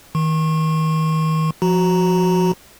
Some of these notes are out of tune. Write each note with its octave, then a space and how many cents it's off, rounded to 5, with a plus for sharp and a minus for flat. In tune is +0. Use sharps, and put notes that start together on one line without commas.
D#3 +40 C#6 -40
F3 +0 F#4 +0 A#5 +0